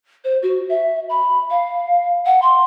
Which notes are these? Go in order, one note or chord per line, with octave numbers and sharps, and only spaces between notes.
C5
F#4
E5
B5
F5
F#5
C6